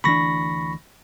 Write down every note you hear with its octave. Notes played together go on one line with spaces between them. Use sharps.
D2 E3 D4 B5 C#6 A#6